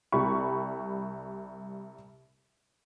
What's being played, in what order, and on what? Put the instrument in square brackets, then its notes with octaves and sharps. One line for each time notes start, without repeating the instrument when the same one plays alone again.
[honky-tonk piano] C2 G3 B5 C#6